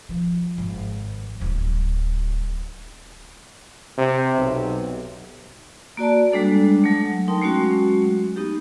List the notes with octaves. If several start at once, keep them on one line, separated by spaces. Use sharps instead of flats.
F3
G#1
D1
C3
B1
A#3 F#4 D5 A5
G3 G#3 D4 A4
F#3 A3
D#4 A#4 G5 A5 C6
F#3 G#3 A3 C#4 F#4
B3 D#4 G4